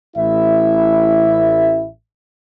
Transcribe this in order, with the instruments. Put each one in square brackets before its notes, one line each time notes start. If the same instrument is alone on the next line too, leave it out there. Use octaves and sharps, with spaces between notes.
[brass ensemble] A1 E4 E5